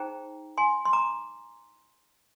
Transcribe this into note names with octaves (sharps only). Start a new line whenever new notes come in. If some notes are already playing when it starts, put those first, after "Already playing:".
Already playing: D#4 G#4 C5 G5 A#5
G#5 C6
C6
A#5 D6